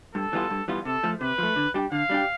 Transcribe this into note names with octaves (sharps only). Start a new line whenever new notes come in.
G2 A4
E3 G3 B3 F4
G2
E3 G3 B3 F4
C3 A4
F3 A3
C3 B4
F3 A3
D3
G3 D4 G4
D3 F5
G3 D4 G4